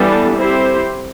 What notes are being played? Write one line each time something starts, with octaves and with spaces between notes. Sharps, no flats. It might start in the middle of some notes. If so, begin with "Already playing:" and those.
Already playing: E3 G3 B3 D4 A4
C4 E4 G4 C5